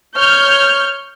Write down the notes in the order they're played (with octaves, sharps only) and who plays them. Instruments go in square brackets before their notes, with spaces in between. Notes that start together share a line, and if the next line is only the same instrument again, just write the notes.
[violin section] C#5 F6 G6